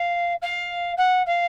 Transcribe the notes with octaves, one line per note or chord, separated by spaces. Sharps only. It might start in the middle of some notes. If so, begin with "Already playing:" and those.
Already playing: F5
F5
F#5
F5